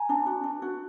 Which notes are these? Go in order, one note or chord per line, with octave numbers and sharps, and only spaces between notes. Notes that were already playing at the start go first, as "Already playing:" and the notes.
Already playing: G#5 A#5
D4
F#4
D4
F#4